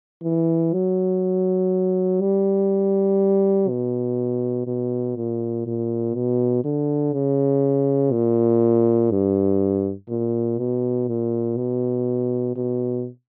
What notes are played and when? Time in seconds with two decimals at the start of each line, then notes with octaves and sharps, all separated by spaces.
0.23 E3
0.73 F#3
2.21 G3
3.69 B2
4.67 B2
5.16 A#2
5.66 A#2
6.15 B2
6.64 D3
7.13 C#3
8.12 A#2
9.11 G2
10.09 A#2
10.59 B2
11.08 A#2
11.57 B2
12.56 B2